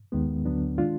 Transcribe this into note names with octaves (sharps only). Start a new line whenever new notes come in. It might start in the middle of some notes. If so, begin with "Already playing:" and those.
D#2 D#3 G#3 B3
D2 D3 F#3 B3 D4
D#3 G#3 D4 F4